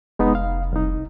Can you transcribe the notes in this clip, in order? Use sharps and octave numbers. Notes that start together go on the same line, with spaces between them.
F1 G#3 B3 D#4
F5
C2 D#4